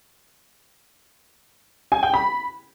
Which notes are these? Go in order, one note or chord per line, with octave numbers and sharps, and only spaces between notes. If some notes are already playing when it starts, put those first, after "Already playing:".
G#5
G5
B5